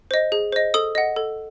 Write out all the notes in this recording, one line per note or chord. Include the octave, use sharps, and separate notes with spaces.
C5 D#5
G#4
C5 D#5
A4 D#6
D#5 F#5
A4